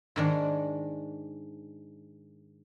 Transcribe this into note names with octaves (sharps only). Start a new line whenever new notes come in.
G#2 D#3 D4